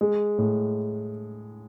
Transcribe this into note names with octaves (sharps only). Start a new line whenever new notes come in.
G#3
A2